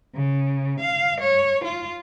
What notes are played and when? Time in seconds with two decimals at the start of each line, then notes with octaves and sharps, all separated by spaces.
0.15 C#3
0.80 F5
1.20 C#5
1.64 F4